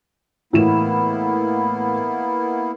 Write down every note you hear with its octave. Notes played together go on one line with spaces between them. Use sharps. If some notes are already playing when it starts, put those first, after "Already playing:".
A2 E3 A#3 B3 E4 E7